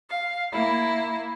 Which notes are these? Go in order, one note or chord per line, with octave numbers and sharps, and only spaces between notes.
F5
A#3 E4